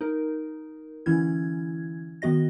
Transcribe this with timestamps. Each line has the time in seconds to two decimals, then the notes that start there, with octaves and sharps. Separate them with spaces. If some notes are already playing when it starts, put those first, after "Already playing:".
0.01 D#4 A#4
1.06 D3 E3 C#4 E4 G#6
2.22 D#3 B3 F#4 D#5 A#6